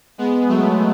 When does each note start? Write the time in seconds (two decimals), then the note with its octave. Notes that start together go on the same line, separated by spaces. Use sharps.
0.18 G#3 B3
0.48 F#3 A3